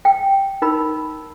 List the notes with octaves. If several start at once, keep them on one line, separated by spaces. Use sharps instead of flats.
G5
D#4 A#4 B5